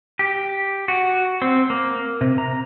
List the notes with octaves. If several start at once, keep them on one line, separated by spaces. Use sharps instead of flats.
G4
F#4
C4
A#3
C3
A#5